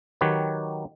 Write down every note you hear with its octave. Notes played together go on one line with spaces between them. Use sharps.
D#3 F#3 G4 B4 C#5